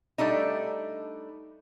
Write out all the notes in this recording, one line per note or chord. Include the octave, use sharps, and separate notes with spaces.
G3 A3 D4 D#4